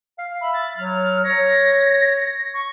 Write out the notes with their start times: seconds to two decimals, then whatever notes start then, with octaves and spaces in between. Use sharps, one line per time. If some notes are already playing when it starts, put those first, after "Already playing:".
0.18 F5
0.41 E5 B5
0.54 A6
0.77 F#3 F6
1.24 C#5 A#6
2.54 C#6